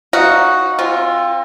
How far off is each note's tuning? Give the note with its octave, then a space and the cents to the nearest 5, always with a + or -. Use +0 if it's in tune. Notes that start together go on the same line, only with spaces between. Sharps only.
D#4 +0 F#4 +0 F5 +0
C4 +35 F4 +0